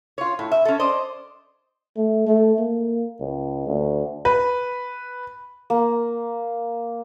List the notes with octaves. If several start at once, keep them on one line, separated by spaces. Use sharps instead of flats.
F4 C#5
A2
E5
C#4 A4
C5 D5 D#5
A3
A3
A#3
C#2
D2
B4
A#3